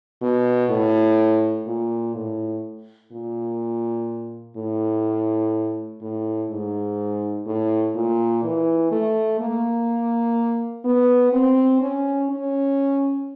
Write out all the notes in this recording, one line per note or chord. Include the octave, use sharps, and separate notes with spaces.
B2
A2
A#2
A2
A#2
A2
A2
G#2
A2
A#2
E3
A3
A#3
B3
C4
C#4
C#4